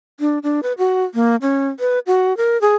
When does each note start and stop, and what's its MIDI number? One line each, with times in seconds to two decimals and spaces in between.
0.20 0.39 62
0.43 0.60 62
0.63 0.73 71
0.78 1.03 66
1.14 1.36 58
1.42 1.69 61
1.80 1.99 71
2.07 2.36 66
2.37 2.60 70
2.61 2.75 68